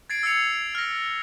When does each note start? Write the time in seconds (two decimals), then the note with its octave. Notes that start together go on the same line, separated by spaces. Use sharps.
0.10 G#6 A6 C7 D7
0.23 E6 G#6 C7 C#7 F7
0.75 F6 A#6